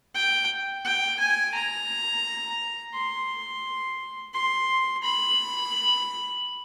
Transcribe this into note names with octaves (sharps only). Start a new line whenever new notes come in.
G5
G5
G#5
A#5
C6
C6
B5